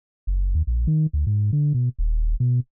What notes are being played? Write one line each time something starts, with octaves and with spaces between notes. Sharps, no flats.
F#1
D#2
A#1
D#3
D2
G#2
D3
B2
D#1
B2